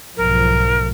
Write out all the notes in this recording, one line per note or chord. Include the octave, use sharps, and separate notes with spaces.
B1 G#2 F3 A#4